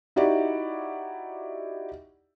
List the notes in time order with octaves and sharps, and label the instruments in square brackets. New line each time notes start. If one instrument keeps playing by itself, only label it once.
[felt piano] D#4 E4 F#4 G4 D5